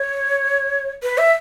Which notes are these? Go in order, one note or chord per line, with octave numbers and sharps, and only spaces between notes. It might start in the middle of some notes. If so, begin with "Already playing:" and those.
Already playing: C#5
B4
E5